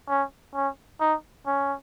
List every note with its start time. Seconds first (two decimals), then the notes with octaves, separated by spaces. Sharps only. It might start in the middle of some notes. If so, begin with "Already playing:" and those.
0.09 C#4
0.54 C#4
1.00 D#4
1.46 C#4